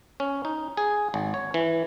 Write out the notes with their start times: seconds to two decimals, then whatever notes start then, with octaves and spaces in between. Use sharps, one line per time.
0.20 C#4
0.45 D#4
0.77 G#4
1.14 G#1
1.34 C#5
1.54 E3